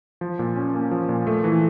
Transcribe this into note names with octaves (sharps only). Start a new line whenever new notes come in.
F3
A#2
C#4
A#3
F3
A#2
A3
E3